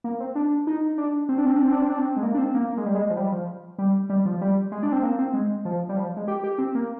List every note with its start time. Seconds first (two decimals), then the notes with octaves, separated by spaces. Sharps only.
0.04 A#3
0.20 C4
0.35 D4
0.67 D#4
0.98 D4
1.29 C4
1.38 D4
1.46 C4
1.56 D4
1.64 C4
1.72 D4
1.82 C4
1.90 D4
1.99 C4
2.17 G#3
2.23 A#3
2.34 D4
2.38 C4
2.55 A#3
2.70 A#3
2.78 G#3
2.86 G3
2.95 G#3
3.10 F3
3.17 G3
3.32 F3
3.78 G3
4.10 G3
4.25 F3
4.41 G3
4.72 G#3
4.83 D4
4.92 C4
5.03 A#3
5.19 C4
5.34 G#3
5.65 F3
5.89 G3
5.97 F3
6.17 G#3
6.28 G4
6.43 G4
6.58 C4
6.75 A#3